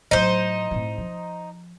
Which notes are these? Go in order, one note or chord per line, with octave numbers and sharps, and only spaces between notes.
A2 F#3 D#4 C5
A2 C4
F3